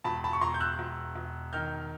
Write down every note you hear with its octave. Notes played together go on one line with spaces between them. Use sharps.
E1 A5 B5
A5 B5
C#6
E1 A#5 C6
G6
E6 F#6
E1
E1
D#3 F6 G6